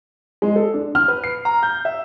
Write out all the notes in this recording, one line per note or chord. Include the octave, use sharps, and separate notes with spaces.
G#3
A4
D4
F6
B4
C7
A#5
G6
E5